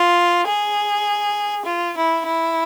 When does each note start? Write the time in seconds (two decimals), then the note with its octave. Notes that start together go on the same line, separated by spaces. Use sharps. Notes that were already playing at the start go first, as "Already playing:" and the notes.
Already playing: F4
0.47 G#4
1.65 F4
1.95 E4
2.25 E4